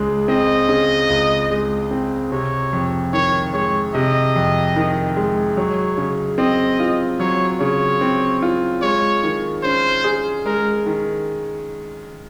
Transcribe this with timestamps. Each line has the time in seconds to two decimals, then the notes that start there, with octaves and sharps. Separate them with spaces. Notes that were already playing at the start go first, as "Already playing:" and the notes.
Already playing: C#2 C#3 G#3
0.28 C4 D#5
0.69 C#3
1.10 C#2
1.51 G#3
1.91 C4
2.32 C3 C#5
2.73 F2
3.13 D#3 C#5
3.53 G#3 C#5
3.94 C3 D#5
4.36 F2
4.76 D#3
5.16 G#3
5.57 F#3 C#5
5.98 C#3
6.38 C4 D#5
6.80 F4
7.20 F#3 C#5
7.60 C#3 C#5
8.01 C4
8.42 F4
8.82 G#3 C#5
9.24 D#3
9.63 C#4 C5
10.04 G#4
10.46 G#3 A#4
10.86 D#3